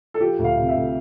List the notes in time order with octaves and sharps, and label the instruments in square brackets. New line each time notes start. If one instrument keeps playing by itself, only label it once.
[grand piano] A4
F3 G4
D2
F5
C3
E5
D2